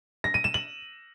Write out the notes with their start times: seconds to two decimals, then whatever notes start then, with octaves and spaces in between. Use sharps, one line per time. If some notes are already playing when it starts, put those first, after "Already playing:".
0.24 A#6
0.34 D#7
0.44 E7
0.54 F#7